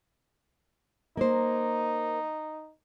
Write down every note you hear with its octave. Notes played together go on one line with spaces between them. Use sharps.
A#3 D#4 C5